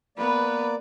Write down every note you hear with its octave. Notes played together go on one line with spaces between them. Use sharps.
A#3 B3 B4 D5